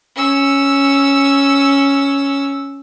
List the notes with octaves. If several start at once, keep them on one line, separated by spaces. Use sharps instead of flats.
C#4 E6